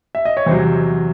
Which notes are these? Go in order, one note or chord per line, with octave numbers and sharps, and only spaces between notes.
E5
D#5
C#5
E2 C3 F#3 C5